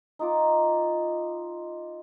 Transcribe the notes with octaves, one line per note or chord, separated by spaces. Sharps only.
D#4 F4 D6